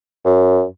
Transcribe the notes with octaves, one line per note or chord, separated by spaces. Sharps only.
F#2